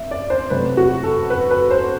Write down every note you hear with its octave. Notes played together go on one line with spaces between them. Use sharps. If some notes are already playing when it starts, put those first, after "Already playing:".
Already playing: C4 E5
D5
C5
C3 F#3 A3 B4
F#4
A4
B4
B4
C5